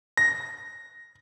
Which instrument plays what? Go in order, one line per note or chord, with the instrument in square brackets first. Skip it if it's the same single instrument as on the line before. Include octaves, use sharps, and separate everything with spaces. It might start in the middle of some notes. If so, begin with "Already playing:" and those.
[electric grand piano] A#6